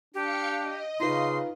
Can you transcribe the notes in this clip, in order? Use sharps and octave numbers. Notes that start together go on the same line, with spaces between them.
D4 G4 F5 G5 C#7
D#5
C#3 D#4 F4 B4 C6